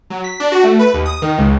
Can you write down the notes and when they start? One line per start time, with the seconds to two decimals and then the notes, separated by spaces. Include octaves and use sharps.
0.10 F#3
0.24 B6
0.40 D4
0.52 F#4
0.63 A3
0.79 B4
0.94 D#2
1.06 D#6
1.22 D#3
1.38 C#2